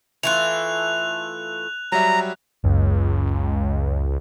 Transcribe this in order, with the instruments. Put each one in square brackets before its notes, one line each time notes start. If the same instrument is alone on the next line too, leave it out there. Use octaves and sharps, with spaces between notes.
[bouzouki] E3 A3 F4 [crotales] F#6 F7
[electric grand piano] F#3 G3 E5 [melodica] A#5
[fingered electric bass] F#1 [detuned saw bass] C#2